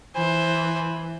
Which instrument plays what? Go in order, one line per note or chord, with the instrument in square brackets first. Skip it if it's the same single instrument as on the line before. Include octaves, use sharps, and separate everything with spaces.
[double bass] E3 [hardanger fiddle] C5 [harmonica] G#5 B5